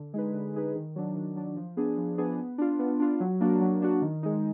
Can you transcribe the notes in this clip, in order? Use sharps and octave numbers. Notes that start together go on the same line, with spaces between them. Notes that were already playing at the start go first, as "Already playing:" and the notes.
Already playing: D3
G#3 D#4 G#4 B4
D3
G#3 D#4 G#4 B4
D#3
F#3 D4
D#3
F#3 D4
F3
B3 D4 G#4
F3
B3 D4 G#4
B3
D4 F4
B3
D4 F4
F#3
A#3 D4 F#4
F#3
A#3 D4 F#4
D#3
G#3 D#4